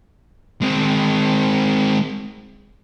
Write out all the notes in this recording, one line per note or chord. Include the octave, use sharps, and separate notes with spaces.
G#3 C4